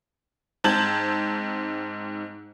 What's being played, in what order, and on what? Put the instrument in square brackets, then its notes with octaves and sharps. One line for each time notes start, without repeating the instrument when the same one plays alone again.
[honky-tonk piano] G#2 C4 A5 G6 G#6 F#7